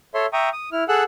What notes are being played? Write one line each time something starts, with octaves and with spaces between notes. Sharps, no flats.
A4 C#5 E5 C6
E5 G5 A#5 C#6 D#6
D#6
E4 F6
G#4 A4 F#5 E6 F#6